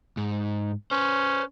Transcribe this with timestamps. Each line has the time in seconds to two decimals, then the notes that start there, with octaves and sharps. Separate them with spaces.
0.17 G#2
0.91 C#4 B4 C5